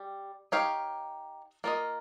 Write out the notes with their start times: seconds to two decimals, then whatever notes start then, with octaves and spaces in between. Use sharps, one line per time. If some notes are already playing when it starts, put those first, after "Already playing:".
Already playing: G3
0.52 D#4 G4 C#5 F5
1.64 A#3 F4 A#4 D#5